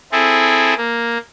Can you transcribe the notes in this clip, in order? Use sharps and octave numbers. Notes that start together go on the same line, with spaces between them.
C4 E4 G#4 A4
A#3